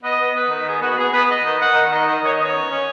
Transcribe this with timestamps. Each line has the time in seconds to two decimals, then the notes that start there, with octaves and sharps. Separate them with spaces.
0.03 B3 D#5
0.20 B3
0.35 B3 B4
0.50 D#3
0.65 B3 G#4
0.81 B3 F#4
0.97 B3 G#4
1.13 B3 B4
1.28 B3 D#5
1.45 D#3
1.60 D#3 F#5
1.75 D#3
1.91 D#3 D#5
2.07 D#3
2.22 D#3 C#5
2.32 D#5
2.39 B3 C#5
2.54 C#4
2.69 C#4